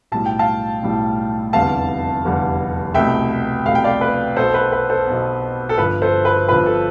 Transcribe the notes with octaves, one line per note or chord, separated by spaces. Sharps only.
B1 A2 G3 A5
G5
F5 A5
B1 A2 G3
F1 E2 D3 G3 F5 A5
F1 E2 D3 G3
C2 B2 A3 E5 G5
C2 B2 A3 F5
G5
D5 F5
B4
B1 B2 B3 A4 C5
B4
B4
A4 C5
B1 B2 B3
A4
G1 G2 F3 B4
A4 C5
B4
G1 G2 F3 B4
A4